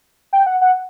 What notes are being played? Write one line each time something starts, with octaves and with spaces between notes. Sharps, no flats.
G5
F#5
F#5